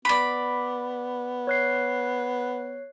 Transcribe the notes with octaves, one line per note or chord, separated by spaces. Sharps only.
B3 D5 B5
C#5 F#6 C7